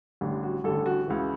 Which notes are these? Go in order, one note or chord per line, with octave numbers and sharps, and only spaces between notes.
A1 G2 D3
F#4
A1 G2 D3 A4
F#4
C#2 C#3 E3